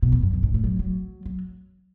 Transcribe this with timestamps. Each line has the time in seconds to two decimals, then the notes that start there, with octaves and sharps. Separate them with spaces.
0.02 B2
0.12 E2
0.23 F#2
0.33 F#2
0.43 G#2
0.54 A2
0.64 F#3
0.79 F#3
1.25 F#3